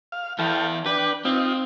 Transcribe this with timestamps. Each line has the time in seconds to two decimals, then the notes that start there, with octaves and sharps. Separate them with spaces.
0.12 F5
0.39 E2 E4 A4 F5 G5
0.86 D4 B4 G5
1.25 C4 D#4 F4